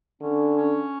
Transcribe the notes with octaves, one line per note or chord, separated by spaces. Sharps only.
D3 C#4
C#4